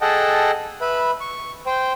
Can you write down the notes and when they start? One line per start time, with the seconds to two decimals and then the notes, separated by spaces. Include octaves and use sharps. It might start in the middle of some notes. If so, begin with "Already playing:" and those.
0.01 G#4 A4 D#5 F#5 G5 A5
0.81 B4 E5 B5
1.20 C#6
1.66 C5 G5